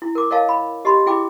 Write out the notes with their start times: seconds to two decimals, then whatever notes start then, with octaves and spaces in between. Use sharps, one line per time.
0.02 E4
0.15 A#4 D6
0.31 A#4 C#5 D#5 F5 A5
0.49 B5
0.85 G4 D#5 A5 B5 C6
1.06 E4 G#4 G5 B5 D6